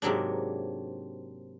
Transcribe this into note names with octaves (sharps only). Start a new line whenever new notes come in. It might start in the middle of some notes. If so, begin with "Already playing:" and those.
G#2 C3 F#3 A#3 D4